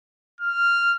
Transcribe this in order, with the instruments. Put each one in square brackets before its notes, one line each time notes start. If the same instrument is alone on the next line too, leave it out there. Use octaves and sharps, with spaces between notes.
[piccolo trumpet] F6